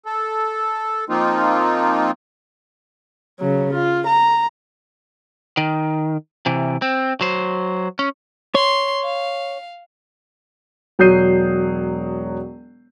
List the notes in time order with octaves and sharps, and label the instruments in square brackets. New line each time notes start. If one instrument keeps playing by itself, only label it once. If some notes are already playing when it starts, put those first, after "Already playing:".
[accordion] A4
F3 A#3 C4 D#4 F4
[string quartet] C#3 F#3
F4
A#5
[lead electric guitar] D#3
C3 E3
C4
F#3 C5
C#4
[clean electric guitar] C#5 [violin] C6
[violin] F5
[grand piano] E1 F#3 D#6 G6 C7 D#7